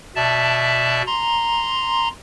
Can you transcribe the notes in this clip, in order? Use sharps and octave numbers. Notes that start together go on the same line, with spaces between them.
B2 D5 E5 A5
A#5 C6